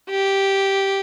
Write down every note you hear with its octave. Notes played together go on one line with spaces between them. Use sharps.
G4